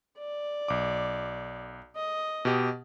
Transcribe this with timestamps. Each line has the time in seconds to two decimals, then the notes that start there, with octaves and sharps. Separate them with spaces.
0.18 D5
0.68 B1 D6
1.96 D#5
2.45 B2 G4